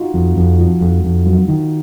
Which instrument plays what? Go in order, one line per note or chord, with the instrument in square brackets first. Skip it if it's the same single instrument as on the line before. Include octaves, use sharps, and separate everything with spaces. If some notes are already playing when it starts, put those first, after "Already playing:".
Already playing: [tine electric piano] D#4 F4 F#4
[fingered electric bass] F2
F2
F3
F2
F2
F#3
D#3